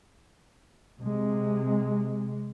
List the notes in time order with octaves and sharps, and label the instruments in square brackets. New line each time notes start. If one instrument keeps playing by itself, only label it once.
[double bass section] C3 G#3